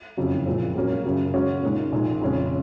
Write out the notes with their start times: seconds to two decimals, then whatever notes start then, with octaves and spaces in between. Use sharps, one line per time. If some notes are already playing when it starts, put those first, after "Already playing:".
0.17 F#1 F2 C#3 F#3 C#4
0.46 A#1 A#2 F3 G#3 C4
0.75 A#2 F#3 A#3 C#4
1.05 F#2 C#3 F#3
1.34 C#3 G#3 C#4 F#4
1.62 A#2 G#3 D#4
1.92 A#1 A#2 G#3 D#4
2.22 F2 C#3 G#3 C#4